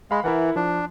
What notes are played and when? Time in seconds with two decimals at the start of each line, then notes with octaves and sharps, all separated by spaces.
0.11 G#3 F5 B5
0.24 E3 E4 A#4 F#5
0.56 F3 D4